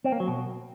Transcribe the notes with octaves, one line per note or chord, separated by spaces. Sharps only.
C4
A#3
F#3
B2